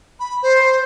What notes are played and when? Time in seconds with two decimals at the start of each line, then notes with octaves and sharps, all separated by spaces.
0.20 B5
0.43 C5